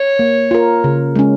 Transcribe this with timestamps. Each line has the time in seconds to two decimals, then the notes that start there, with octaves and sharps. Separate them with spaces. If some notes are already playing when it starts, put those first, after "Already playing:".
Already playing: C#5
0.19 A#3
0.51 F4 A#4
0.84 C#3
1.16 G#3 C#4